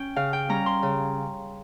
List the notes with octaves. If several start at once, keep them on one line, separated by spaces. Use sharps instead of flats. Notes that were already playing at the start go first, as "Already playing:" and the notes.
Already playing: C#4 G5
C#3 F5
G5
G3 C#4 A#5
C6
C#3